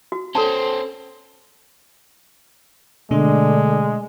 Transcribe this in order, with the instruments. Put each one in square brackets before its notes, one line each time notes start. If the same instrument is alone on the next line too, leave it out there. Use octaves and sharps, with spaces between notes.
[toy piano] F#4
[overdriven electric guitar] C#4 C5 [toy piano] A4 A5
[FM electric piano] B2 A3 D4 [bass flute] D3 [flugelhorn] G#3